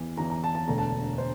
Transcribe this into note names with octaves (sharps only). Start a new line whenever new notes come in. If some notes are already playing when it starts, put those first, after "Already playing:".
Already playing: E2 E3
E2 E3 A#5
A#5
A5
A5
E1 D2 D3 A#5
A5
C5